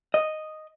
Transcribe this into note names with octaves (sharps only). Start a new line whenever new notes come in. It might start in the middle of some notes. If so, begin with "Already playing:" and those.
D#5